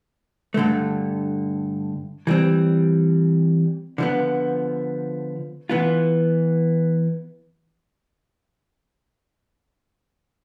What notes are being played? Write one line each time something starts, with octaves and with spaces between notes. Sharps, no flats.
G2 D3 A3
E3 G3 C4
D3 F3 B3
E3 B3 F4